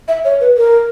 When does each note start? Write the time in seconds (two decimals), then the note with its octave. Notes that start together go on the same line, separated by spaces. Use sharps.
0.08 E5
0.25 C#5
0.41 B4
0.57 A#4